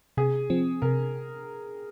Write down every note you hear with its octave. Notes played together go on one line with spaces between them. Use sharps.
C3 G#4
F3 C4
C3 A#4